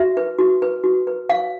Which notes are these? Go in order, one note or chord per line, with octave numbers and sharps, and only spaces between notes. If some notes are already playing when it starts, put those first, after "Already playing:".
Already playing: F#4 E5
B4
F#4
B4
F#4
B4
C#5 F5